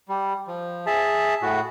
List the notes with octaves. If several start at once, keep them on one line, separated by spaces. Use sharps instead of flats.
G3
F3
G#4 E5 A5
A2 F#4